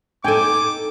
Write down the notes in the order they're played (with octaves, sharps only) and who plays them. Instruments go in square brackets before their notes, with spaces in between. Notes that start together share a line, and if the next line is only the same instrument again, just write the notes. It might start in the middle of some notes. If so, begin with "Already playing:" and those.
[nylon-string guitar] D#4 A4 [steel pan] G5 G#5 [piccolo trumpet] D6